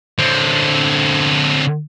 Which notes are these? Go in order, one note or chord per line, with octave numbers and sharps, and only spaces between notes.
D3 C4